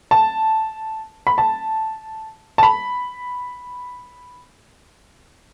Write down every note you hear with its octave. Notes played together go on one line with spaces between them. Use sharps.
A5
B5
A5
A5
B5